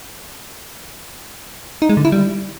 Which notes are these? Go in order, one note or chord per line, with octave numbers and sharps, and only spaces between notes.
D#4
G#3
D3
E4
G3